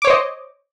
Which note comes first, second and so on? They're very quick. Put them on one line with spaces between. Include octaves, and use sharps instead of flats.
D6 C#5 C5 D#5